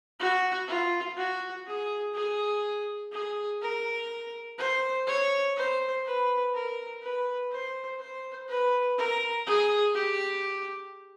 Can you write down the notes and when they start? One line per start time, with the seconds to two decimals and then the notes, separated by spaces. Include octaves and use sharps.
0.20 F#4
0.68 F4
1.17 F#4
1.67 G#4
2.14 G#4
3.12 G#4
3.61 A#4
4.58 C5
5.07 C#5
5.57 C5
6.05 B4
6.54 A#4
7.02 B4
7.52 C5
7.99 C5
8.49 B4
8.98 A#4
9.46 G#4
9.95 G4